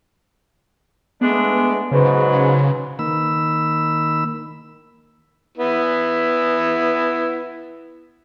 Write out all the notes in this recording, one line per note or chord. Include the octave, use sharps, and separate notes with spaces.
G#3 A3 B3 D4
G#2 C#3 F#3 B4
D#3 A#3 B5 E6
B3 E4